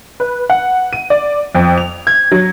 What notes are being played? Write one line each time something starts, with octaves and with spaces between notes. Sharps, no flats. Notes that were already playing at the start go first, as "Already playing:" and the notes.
B4
F#5
D#7
D5
F2
F7
G#6
F#3